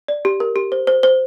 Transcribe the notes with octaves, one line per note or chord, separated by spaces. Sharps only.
D5
G4
A#4
G4
C5
C5
C5